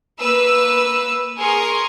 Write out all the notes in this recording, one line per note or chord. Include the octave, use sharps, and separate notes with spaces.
A#3 B4 E6
G#4 A#4 G#5 C6 C#6